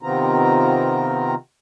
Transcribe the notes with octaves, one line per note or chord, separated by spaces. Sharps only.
C3 D#3 B3 C4 F4 A#5